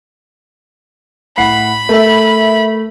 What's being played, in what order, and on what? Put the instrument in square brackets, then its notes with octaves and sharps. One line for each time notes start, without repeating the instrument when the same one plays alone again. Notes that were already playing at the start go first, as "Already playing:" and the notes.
[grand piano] A2 F#5 C7 [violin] B5
[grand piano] A3 [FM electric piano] A#4 E5